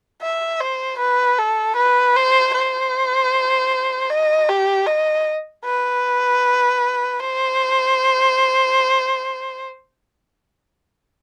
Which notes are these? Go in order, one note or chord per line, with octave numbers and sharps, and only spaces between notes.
E5
C5
B4
A4
B4
C5
C5
D#5
G4
D#5
B4
C5